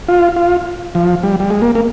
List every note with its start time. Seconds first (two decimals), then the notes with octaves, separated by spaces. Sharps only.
0.08 F4
0.36 F4
0.95 F3
1.23 G3
1.40 G3
1.50 G#3
1.62 A#3
1.75 A#3